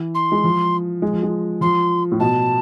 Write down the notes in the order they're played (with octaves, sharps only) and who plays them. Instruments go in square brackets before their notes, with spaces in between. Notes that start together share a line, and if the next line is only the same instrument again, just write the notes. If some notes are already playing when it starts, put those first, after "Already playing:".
Already playing: [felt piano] E3
[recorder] C6
[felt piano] G#3
F3
G#3
F3
G#3
[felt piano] F3 [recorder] C6
[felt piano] A2
[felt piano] B2 [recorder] A5